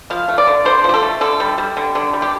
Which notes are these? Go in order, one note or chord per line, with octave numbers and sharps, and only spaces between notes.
F3 F5
A3
D5
D3
D3 C5
F3 G4
A4
A3
D3 A4
G3
G3
D3
D3
G3
G4